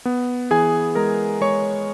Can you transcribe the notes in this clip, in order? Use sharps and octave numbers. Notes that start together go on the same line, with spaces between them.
B3
E3 G#4 G#5
G#3 A#4 A#5
G#3 C#5 C#6